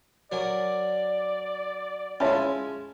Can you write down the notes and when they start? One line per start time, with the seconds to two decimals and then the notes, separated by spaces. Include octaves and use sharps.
0.32 F#3 A#4 D5 G#5
2.20 G#3 C#4 E4 F4 C#5 A5 B5